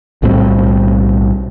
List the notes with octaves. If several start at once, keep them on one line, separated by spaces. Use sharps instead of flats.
B1 A2 G3 C4